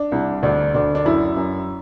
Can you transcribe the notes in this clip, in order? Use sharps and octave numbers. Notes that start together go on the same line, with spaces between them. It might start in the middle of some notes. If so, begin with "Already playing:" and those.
Already playing: D4
C2
D2 D4
D2 D4
D4
F#2 E4
F#2